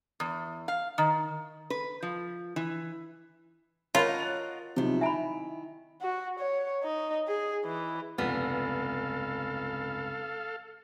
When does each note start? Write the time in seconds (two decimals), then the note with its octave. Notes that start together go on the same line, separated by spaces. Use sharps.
0.20 E2
0.68 F5
0.98 D#3
1.70 B4
2.02 F3
2.56 E3
3.95 F4 F#4 A#4 C#5 D#5 F5 A5 B5
4.20 F#6 A6 F7
4.76 B1 C3 D#3 F3 E4
5.01 E5 G#5 A#5 B5 D7
6.02 F#4
6.40 C#5
6.84 D#4
7.28 G#4
7.65 E3
8.18 F1 C#2 G2 B3 A4 F5